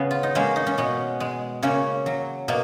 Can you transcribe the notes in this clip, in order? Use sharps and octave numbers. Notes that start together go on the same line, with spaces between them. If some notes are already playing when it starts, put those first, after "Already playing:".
Already playing: C#3 B3
F4
D#4
G#3 A#3 C#4
D#4
C#4
B2 B3
G#3
C#3 A#3 C#4
F#3
B2 A#3